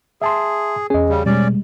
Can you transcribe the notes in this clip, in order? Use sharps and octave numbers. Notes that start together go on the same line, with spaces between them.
G#4 E5 A5 C6
E2 C#4 G#4 D#5
C#3 G3
B2 G3 G#3 C#4 D5